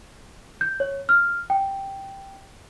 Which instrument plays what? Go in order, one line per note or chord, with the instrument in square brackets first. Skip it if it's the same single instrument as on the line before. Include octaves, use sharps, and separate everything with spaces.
[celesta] G6
C#5
F6
G5